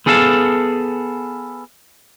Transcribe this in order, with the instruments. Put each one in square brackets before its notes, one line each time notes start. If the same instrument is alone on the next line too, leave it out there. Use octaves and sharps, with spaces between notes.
[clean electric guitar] B3 G#4 A4 F5 G#5 A5